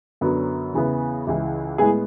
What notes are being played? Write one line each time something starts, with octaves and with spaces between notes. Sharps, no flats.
F#2 D3 F#3 B3
E2 C#3 E3 B3
C#2 C#3 E3
A2 G#3 B3 G#4